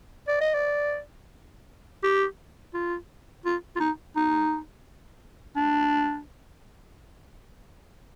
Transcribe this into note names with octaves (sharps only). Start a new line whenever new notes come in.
D5
D#5
D5
G4
F4
F4
F4
D#4
D#4
D4